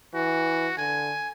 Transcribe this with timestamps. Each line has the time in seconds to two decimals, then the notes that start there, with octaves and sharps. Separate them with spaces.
0.14 E3 F#4
0.78 D3 G#5